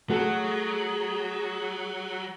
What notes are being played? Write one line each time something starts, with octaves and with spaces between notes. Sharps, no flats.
F#3 A3 F#4 G#4 A4